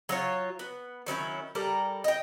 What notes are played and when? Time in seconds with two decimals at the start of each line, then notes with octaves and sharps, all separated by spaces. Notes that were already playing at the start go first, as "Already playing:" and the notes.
0.09 F#3 F4 C#5
0.59 B3
1.06 D#3 F#3 C#4 E4
1.55 G3 A4 A#4 D5
2.04 D#5 G5